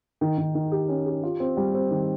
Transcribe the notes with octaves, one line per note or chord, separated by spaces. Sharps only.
D#3
D#3
D#3
G4
C#4
G4
F4
C4
G3
C4
D#3